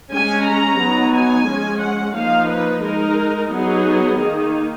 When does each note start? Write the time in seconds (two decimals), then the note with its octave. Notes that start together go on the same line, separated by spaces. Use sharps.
0.11 G#3 C#4 G#5
0.45 A#5
0.79 F#3 B3 D#4
1.13 G#5
1.47 F3 G#3 C#4
1.80 F#5
2.14 F3 A#3 D#4 F5
2.49 B4
2.82 G#3 D#4 A#4
3.50 F#3 B3 D#4 G#4
4.18 D#3 A#3 D#4